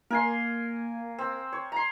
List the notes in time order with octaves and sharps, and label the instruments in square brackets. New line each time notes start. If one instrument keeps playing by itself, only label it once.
[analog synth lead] A#3 [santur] A#4 G#5 C6
[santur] C4
C#5
A#5 C6